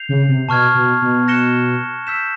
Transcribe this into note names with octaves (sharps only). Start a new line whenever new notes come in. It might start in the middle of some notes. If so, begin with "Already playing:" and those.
Already playing: G6 C7 F7
C#3
C3
B2 A5 C#6 F6 G#6
B2
B2
F#6 A#6 C#7 E7 G7
E6 G6 B6 E7